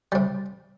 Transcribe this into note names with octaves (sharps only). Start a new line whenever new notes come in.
C3 G3